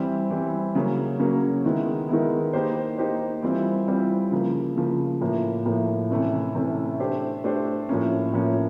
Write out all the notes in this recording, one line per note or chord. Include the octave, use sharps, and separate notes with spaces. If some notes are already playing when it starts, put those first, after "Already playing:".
Already playing: E3 G3 C4
E3 G3 C4
C#3 F#3 A#3 C#4
C#3 F#3 A#3 C#4
D#3 G#3 B3 E4
D#3 G#3 B3 E4
A#3 D#4 G4 C5
A#3 D#4 G4 C5
E3 G3 C4 F4
E3 G3 C4 F4
C#3 F3 A#3
C#3 F3 A#3
A2 F3 A#3
A2 F3 A#3
C3 E3 A3 C#4
C3 E3 A3 C#4
A3 D4 G4 C5
A3 D4 G4 C5
A2 F3 A#3 C#4
A2 F3 A#3 C#4